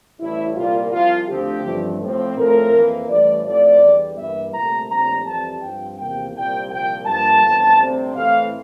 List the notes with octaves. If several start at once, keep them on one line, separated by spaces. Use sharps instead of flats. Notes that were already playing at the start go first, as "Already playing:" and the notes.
A1 A2 G3 E4
C2 A#2 G3 A#3 F4
C2 C3 F3 F4
D2 D3 F3 C4 G4
A1 G2 F3 A3 C4
A2 F3 C4
A2 F3 A3 C4 A#4
F2 E3 A#3
A1 A2 E3 G3 D5
A2 F3 C4 D5
E2 D3 G3
G2 E3 A#3 E5
C2 A#2 A3 A#5
A#1 A2 G3 C4 A#5
F2 E3 G3 C4 A5
G2 F3 C4 G5
E2 C3 F3 A#3 G5
C2 A#2 G3 C4 G5
C2 A#2 F3 G5
G2 F3 A#3 A5
G1 F2 E3
D2 C3 G3 C4
A2 E3 A3 C4 F5